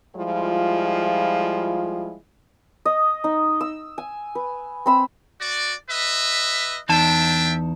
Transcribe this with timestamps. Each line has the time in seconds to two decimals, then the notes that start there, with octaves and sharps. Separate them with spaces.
0.16 F3 G3 G#3 E4 F4
2.85 D#5
3.24 D#4
3.61 E6
3.98 G#5
4.35 B4
4.86 C4 B5 E6
5.40 F#4 D5
5.90 B4 D#5 E5
6.89 E2 D4 D#4 E5 G5 A5